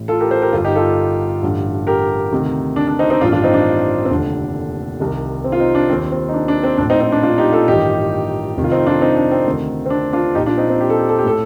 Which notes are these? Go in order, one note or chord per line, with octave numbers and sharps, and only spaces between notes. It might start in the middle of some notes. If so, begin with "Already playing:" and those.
Already playing: A1 A2
F4 A4
G4 A#4
A4 C5
G4 A#4
G1 G2 D3 F4 A4
D#4 G4
F4 A4
A1 G2 D3
G4 A#4
D2 C3 D#3
D4
D4
C4 D#4
C4 D#4
A1 G2 D#3 D4 F4
D4 F4
C4 D#4
D4
C4
F1 D#2 D3 D4
C2 C3 D#3
C4
F4
C4 D#4
D4
D#2 D#3 C4
C4
D#4
D4
D4
C4
A#1 A2 D4
C4 D#4
C4 D#4
D4
D4 F4
D#4 G4
F4 A4
A1 G2 D#3 D#4 G4
F1 F2 C3 D#3
F4
C4 D#4
D4 F4
C4 D#4
D4
C4
D2 C3 D#3
C4
D4
D4 F4
A#1 A#2 D#4 G4
D4 F4
C4 D#4
C4 D#4
G4
A4
G4
A4
G4
A2 A4